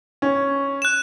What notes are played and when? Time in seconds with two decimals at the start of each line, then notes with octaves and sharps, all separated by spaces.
0.22 C#4
0.82 F#6 E7